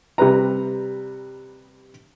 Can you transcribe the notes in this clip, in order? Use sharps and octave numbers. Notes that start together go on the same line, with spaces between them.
C3 G3 B4 A#5